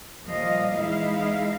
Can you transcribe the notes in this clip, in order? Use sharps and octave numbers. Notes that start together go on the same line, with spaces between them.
D#2 A#2 F3 G3 D#5 F5
E2 G#3 D#4 E4 F5